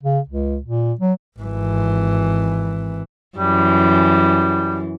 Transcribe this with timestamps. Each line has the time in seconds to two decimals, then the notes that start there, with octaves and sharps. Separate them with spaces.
0.03 C#3
0.29 C#2
0.63 A#2
1.01 F#3
1.39 G#1 E3
3.38 F#2 E3 G3